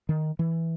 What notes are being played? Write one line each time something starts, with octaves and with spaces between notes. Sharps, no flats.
D#3
E3